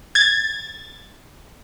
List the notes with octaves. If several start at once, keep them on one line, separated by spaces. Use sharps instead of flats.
G#6 A6